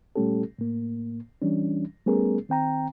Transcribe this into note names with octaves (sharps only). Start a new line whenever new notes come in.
A#2 G3 A3 C#4 G4 A4
A2 A#3
E3 G3 C#4 D4
G3 A3 B3 C#4 G#4 A#4
D#3 C4 G5 A#5